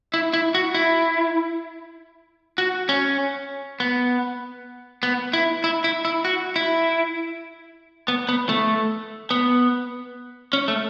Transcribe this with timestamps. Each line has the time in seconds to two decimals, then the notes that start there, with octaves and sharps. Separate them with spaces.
0.14 E4
0.33 E4
0.55 F#4
0.75 E4
2.58 F#4
2.89 C#4
3.80 B3
5.03 B3
5.33 E4
5.64 E4
5.84 E4
6.05 E4
6.25 F#4
6.56 E4
8.08 B3
8.29 B3
8.49 A3
9.31 B3
10.53 C#4
10.68 A3